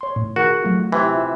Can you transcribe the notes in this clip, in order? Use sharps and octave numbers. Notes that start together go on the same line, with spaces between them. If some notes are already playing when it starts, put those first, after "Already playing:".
C#5 C6
A2
D#3 F#4 G#4 A#4
F#3 A3 F4
C3 E3 B5
F4 E5